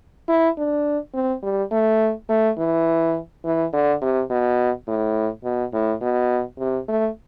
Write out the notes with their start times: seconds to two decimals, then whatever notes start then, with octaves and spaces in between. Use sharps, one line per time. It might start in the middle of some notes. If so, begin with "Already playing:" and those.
0.29 E4
0.58 D4
1.14 C4
1.43 G3
1.72 A3
2.29 A3
2.58 E3
3.45 E3
3.73 D3
4.02 C3
4.30 B2
4.88 A2
5.44 B2
5.73 A2
6.02 B2
6.59 C3
6.88 A3